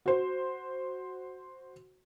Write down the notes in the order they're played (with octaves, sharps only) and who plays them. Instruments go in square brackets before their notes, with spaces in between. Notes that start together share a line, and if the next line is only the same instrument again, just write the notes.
[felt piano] F#4 C5